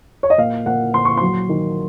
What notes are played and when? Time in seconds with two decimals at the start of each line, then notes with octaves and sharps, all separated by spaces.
0.23 C#5
0.30 D#5
0.38 A#2 F5
0.66 A#2 F#5
0.94 A#2 C6
1.05 C#6
1.17 F#3 C6
1.49 D#3